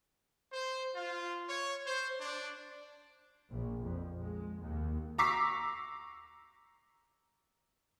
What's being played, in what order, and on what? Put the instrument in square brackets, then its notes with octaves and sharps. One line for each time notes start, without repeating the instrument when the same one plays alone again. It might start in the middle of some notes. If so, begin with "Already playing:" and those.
[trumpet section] C5
F4
C#5
C5
D4
[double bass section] A#1
F2
G#3
D#2
[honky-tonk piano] A#5 C#6 D6 E6 B6 C7